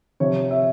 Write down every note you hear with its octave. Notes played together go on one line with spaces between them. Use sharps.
C3 F3 C#5
E5